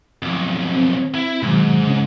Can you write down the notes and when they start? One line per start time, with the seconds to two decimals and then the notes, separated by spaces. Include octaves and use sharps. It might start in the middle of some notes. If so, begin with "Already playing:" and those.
0.23 B1 F2
0.72 C4
1.15 E4
1.43 G#2 B2 D#3 F#3
1.87 C#3 C#4